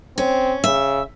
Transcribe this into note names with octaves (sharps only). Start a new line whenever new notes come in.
C4 C#4
C#3 E5